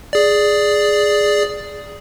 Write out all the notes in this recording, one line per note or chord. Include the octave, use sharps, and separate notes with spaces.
G#4 D5